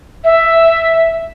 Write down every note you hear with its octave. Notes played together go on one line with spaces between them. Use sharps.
E5